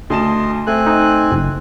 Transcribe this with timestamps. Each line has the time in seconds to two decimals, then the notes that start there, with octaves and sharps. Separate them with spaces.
0.10 D2 D#5 A5 C6 E7
0.67 A3 C4 G#5 F#6
0.87 D#4
1.32 F#1